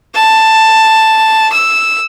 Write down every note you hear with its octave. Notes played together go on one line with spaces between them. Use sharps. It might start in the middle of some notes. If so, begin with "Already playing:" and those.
A5
E6